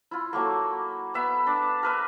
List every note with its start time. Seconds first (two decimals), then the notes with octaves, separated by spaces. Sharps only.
0.11 E4 F4
0.33 F#3 A3 A#3
1.14 B3 E5
1.47 D4
1.83 A#4 B4 E5